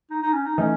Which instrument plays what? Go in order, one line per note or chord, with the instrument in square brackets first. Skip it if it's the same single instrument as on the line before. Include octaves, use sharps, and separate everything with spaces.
[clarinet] D#4
D#4
C#4
D#4
[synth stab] E3 A3 D#4 [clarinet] C#4